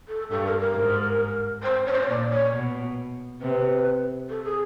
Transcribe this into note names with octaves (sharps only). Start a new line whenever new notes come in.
A4
G2 A4
A#4
A#4
G#2
C5
C#5
C5
C#5
A#2 D5
C#5
B2
C3 B4
A4
G#4